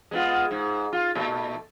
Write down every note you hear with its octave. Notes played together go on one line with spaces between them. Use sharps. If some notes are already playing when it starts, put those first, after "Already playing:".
G#3 B3 F4
G#2
F4
A#2 A3